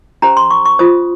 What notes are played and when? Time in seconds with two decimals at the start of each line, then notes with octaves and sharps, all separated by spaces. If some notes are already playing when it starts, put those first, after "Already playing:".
0.22 C#4 G4 C5 A#5
0.37 C6
0.51 C#6
0.65 C#6
0.79 F4 C5 D#6